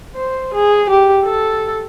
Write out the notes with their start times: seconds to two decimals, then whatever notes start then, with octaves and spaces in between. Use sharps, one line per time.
0.16 C5
0.54 G#4
0.90 G4
1.25 A4